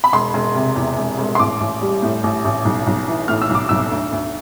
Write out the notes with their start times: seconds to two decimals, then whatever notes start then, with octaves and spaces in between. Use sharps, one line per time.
0.04 B5
0.13 E1 C6
0.34 E1
0.55 C3
0.76 E2
0.98 E1
1.19 E1
1.35 C6
1.39 A1 D6
1.60 A1
1.82 G3
2.02 A2
2.23 A1
2.45 A1
2.65 B1
2.86 B1
3.08 E3
3.28 A2 F6
3.42 E6
3.50 B1
3.55 D6
3.69 B1 E6
3.91 D2
4.12 D2